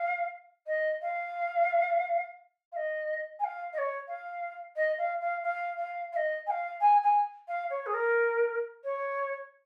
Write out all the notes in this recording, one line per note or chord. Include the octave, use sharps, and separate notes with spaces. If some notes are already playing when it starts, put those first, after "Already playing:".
Already playing: F5
D#5
F5
F5
D#5
G#5
F5
D#5
C#5
F5
D#5
F5
F5
F5
F5
F5
D#5
G#5
F5
G#5
G#5
F5
C#5
G#4
A#4
C#5